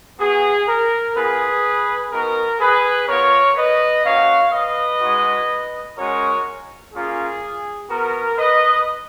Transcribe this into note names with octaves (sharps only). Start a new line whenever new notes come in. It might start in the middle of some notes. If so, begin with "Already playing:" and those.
B3 F#4 G#4
A#4
B3 F4 G#4 B4
B3 D#4 F#4 A#4
G#4 B4
B3 F4 A#4 C#5
B4 D#5
A#3 C#4 F#4 C#5 F5
B4 D#5
G#3 D#4 F#4
G#3 C#4 F#4 A#4 C#5
A#3 C#4 F4 G#4
B3 F#4 A#4
B4 D#5